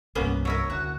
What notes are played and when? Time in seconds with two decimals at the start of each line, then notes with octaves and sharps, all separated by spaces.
0.15 C2 G2 A#3 B3 C#4
0.45 F#3 E4 A#4 C#5
0.70 D2 F#4